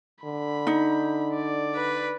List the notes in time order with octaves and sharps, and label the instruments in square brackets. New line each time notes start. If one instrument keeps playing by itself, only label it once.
[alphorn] D3 [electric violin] B5
[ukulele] D#4
[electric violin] D5
[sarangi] B4